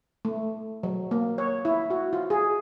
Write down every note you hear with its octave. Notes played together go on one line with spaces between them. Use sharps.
A3
F#3
A#3
C#5
E4
F#4
F4
G#4